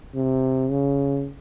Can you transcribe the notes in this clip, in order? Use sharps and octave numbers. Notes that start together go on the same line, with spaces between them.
C3
C#3